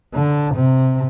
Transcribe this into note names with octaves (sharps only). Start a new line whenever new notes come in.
D3
C3